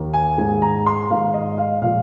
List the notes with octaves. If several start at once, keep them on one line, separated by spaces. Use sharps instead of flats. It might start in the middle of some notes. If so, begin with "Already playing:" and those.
Already playing: D#2 D#3 A#3
G#5
G#2 D#3 G#3 G#5
A#5
C6
G#2 D#3 G#3 F5
D#5
F5
A#2 F3 G#3 F5